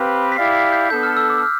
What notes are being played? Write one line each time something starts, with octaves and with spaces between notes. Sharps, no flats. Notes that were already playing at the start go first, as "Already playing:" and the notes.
Already playing: C4 G4 B4 F5
B6
E4 G4 D5 F5 C7
B6
G6
B3 D4 A4 G6
F6
E6
D6
F6